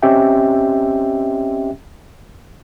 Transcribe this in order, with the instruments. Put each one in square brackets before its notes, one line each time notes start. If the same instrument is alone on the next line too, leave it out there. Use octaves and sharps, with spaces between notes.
[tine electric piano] C4 C#4 G4 D#5 E5 G5